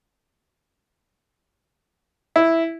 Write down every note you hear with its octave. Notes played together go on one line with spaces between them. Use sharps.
E4